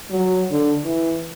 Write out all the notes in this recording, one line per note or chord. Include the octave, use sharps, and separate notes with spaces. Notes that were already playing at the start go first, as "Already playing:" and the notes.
F#3
D3
E3